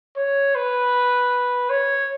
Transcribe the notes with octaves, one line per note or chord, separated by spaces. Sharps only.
C#5
B4
C#5